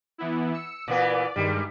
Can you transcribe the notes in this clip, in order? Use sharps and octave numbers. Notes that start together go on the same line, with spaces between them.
E3 B3 E4
E6 C#7
A#2 E3 B3 D5
G2 D#3 G3 G#3